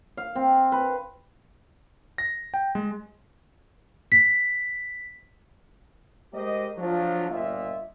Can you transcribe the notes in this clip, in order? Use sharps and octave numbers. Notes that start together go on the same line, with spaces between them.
F5
C4
B4
A#6
G5
G#3
B6
G#3 G4 A#4 C5 D#5
F3 F#3 A3 D4 F4
G1 A#2 F4 D#5 E5